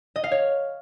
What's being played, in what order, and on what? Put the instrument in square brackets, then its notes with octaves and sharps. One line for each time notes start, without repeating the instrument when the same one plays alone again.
[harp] D#5
F5
C#5